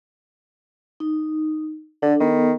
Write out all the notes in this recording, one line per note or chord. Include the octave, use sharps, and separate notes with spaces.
D#4
D3 D4 A4
D#3 B3 A4